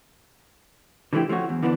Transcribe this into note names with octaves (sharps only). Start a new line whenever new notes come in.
D3 E3 F3 A3 E4 G4
F3 A3 C#4 F#4
E2
D3 E3 F3 B3 C4 D4